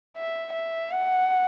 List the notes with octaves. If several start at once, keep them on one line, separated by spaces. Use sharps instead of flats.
E5
E5
F#5